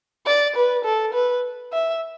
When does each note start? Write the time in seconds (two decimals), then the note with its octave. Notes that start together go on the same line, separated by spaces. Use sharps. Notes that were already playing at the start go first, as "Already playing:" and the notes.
0.26 D5
0.56 B4
0.85 A4
1.14 B4
1.73 E5